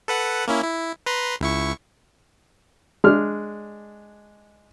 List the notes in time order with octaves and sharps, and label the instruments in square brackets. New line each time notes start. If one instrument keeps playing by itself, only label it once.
[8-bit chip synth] A4 B4 F#5
A#3 C#4 E4
E4
B4 A#5 C6
C#2 E4 C#6
[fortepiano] G#3 D4 F6